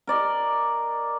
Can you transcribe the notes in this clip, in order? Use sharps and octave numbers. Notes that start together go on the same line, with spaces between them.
A#4 D5 D#5